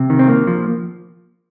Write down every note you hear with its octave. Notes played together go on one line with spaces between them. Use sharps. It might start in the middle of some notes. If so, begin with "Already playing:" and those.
Already playing: C3
D#3
C4
A#3
F3